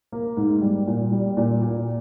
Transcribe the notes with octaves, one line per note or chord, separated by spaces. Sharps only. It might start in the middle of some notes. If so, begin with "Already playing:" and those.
A#3
G#2
G3
A#2
G3
A#2
A#2